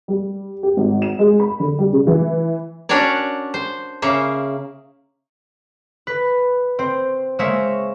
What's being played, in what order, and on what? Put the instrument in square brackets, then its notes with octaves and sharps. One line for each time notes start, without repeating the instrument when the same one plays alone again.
[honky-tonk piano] G3
G4
G#1
E7
G#3
B5
D3
G3
C#3
E3
[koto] C#4 D4 F#4 A#4 C#5 D5
C5
C#3 A#3 E5
[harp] B4
C4 C5
G#3 A#3 A#4 C5 C#5 E5